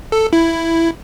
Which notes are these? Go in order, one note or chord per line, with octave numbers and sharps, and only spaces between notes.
A4
E4